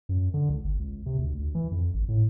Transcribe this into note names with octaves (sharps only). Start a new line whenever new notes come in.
F#2
D3
C#2
G1
C#2
C3
D2
D2
E3
F2
G#1
A2